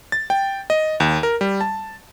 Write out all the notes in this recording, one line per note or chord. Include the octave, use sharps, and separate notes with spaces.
A6
G5
D#5
D#2
A#4
G3
A5